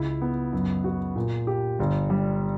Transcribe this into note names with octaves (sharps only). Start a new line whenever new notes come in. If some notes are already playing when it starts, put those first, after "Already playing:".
Already playing: C#2 E4
B3
F#2
F#4
A#2
G4
G1
G3